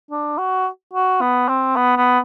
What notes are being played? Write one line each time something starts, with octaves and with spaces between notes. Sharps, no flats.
D4
F#4
F#4
B3
C4
B3
B3